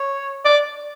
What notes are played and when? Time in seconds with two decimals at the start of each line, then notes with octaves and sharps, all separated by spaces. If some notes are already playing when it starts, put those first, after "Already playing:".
Already playing: C#5
0.45 D5